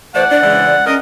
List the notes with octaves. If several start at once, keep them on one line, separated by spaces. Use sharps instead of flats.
E3 A3 C5 D5 F#5
D4 D5
C#3 E3 G#3
C#4 A#4 D#5